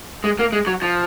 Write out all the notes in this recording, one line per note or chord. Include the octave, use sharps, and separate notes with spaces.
G#3
A#3
G#3
F#3
F3